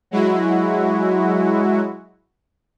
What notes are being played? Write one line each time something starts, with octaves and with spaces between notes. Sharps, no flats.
F#3 G#3 E4 F#4